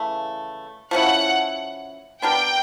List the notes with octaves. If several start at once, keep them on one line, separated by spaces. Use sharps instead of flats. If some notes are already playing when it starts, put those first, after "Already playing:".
Already playing: C#3 E3 A3
F3 A3 C#4 E4 F#5
B3 D4 G4 A#4 G5